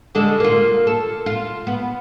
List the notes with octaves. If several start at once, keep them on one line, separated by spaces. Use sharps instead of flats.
D3 G#3 A4
A#3 F4
A4
F4
B3